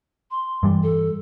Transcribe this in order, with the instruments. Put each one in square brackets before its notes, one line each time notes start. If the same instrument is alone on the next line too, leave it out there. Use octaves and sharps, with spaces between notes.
[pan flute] C6
[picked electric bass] G2 E3 G3
[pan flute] A4